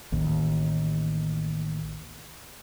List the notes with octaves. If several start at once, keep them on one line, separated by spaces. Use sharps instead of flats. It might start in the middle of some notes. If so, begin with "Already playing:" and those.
A1 D#2